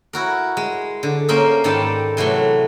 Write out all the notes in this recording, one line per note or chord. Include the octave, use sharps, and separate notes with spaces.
E4 F#4 A#4
G#3
D3
A#3 C#4 A#4 C5 D#5 E5
G#2 D#3 G3 A4 D5 A5
C3 E3 F#3 A3